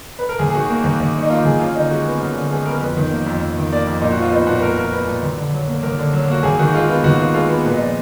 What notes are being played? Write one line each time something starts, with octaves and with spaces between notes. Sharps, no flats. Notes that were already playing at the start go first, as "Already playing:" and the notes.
B4
A#4
D#2 G#4
G#4
D#3 F#4
A#3
D#2
D#2
D#3
D#4
A#3 F4
D#2 G#4
F#2 F4
D3 D#4
G#3 F#4
B3
F#2
D3
G#3 G#4
B3 A#4
A#4
F2 B4
D#3
A#3
F2
F2
D#3
A#3 D5
F2
A#2 D#4
F#4
F3 F4
B3 D#4
A#2 F#4
B4
A#2 A#4
F3 A#4
B3 B4
A#2
D#2
D3
F#3
A#3
D#2 A#4
D3
F#3
A#3 F#4
D#2 G#4
D#3 F#4
G#3 F4
B3 F4
D#2 F#4
D#3 F4
G#3 F4
B3 F#4
A#2 B4
D#5
F3 D5